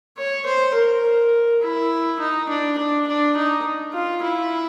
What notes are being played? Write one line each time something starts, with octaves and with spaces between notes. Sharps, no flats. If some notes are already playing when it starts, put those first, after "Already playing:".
C#5
C5
A#4
E4
D#4
D4
D4
D4
D#4
F4
E4